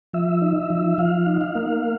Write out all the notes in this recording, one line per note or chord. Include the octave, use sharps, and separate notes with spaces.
F3 E5
D#4
E5
F3
F3 F5
D#4
F5
A#3